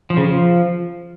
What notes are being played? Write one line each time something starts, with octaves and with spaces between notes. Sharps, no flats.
F3
C#3
F3